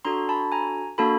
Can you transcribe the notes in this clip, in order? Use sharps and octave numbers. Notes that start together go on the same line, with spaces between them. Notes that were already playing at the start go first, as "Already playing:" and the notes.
D4 F#4 A4 A#5 C6
A5 B5
G#5 A#5
A#3 D4 F#4 A4 A5 B5